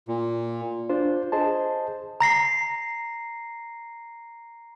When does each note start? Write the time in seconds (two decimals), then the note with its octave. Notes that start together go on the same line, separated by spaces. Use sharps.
0.08 A#2
0.89 D4 F4 C5
1.32 G#4 C5 D#5 A5
2.20 A#5 A#6 C7